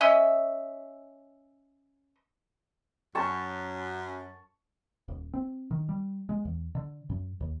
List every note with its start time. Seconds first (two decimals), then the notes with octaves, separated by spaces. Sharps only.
0.01 C#4 D#5 E5
3.15 F#2 A5 C#6
5.08 D#1
5.34 C4
5.71 D#3
5.89 G3
6.29 G#3
6.45 E2
6.75 D3
7.10 F#2
7.40 D#2